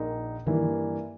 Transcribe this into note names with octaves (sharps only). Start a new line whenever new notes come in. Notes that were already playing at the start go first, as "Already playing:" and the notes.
Already playing: A#1 A#2 A#3 D#4
G2 D#3 E3 A#3